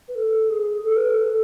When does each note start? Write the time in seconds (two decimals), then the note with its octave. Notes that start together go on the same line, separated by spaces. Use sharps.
0.08 B4
0.15 A4
0.49 G#4
0.82 A4
0.96 B4
1.10 A4